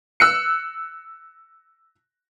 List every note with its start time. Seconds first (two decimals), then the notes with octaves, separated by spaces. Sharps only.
0.20 E6 F#6 C#7